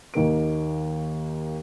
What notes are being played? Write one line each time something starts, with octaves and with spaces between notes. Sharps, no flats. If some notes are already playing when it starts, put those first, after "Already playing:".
D#2 D#3 A#3 D7